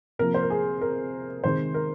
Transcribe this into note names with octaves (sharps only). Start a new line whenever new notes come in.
C3 F3 A#3 A#4
C5
A#4
G#4
A#4
C3 D#3 G#3 C5
A#4